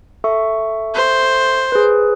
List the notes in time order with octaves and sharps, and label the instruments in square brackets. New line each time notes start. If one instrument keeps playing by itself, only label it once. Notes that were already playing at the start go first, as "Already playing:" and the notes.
[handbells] A4 E5 C#6
[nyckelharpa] C5
[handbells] G#4 B4